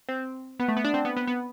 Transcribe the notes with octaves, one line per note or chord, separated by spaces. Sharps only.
C4
B3
A3
B3
D4
C4
B3
B3
B3